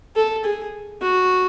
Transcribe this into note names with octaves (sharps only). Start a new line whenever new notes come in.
A4
G#4
F#4